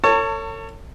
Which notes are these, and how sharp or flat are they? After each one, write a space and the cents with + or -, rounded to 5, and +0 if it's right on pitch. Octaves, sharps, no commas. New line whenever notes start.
A4 +45 C#5 +5 A5 +35